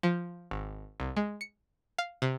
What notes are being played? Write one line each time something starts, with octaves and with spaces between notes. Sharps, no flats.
F3
G#1
C2
G#3
C#7
F5
C3